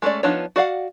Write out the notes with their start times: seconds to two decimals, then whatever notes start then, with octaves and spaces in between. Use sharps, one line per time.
0.02 G#3 A3 C#4 D5
0.23 F3 B3 D4 D#4 C#5
0.56 F#4 D5 F5 F#5